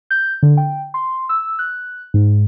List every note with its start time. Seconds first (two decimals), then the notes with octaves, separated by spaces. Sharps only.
0.11 G6
0.43 D3
0.57 G5
0.94 C6
1.29 E6
1.59 F#6
2.14 G#2